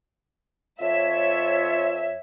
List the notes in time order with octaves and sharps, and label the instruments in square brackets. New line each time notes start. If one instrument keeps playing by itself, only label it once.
[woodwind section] F2 F4 C#5 [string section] E5